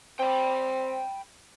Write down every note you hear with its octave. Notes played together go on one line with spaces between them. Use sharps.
C4 G5 B5